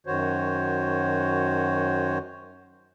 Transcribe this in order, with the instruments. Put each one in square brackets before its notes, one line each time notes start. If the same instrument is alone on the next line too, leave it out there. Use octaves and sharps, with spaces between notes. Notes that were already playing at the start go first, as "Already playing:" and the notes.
[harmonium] F#2 D#3 F#4 C5 C#5